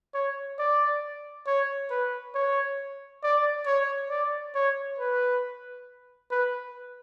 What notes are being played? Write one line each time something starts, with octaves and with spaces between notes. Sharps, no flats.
C#5
D5
C#5
B4
C#5
D5
C#5
D5
C#5
B4
B4